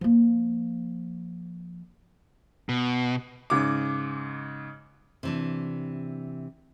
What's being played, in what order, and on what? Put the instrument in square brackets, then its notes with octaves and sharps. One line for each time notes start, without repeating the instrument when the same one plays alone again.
[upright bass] F3 A#3
[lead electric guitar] B2
[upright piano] G#2 C#3 D6
[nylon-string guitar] C3 E3 D4